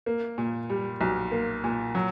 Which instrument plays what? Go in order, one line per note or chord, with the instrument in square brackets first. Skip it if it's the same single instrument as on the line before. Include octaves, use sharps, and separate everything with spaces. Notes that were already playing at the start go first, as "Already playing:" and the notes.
[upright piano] A#3
A#2
G3
B1
A#3
A#2
F#3